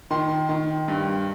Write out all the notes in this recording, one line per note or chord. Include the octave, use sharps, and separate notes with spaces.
D#3 C6
D#3
G2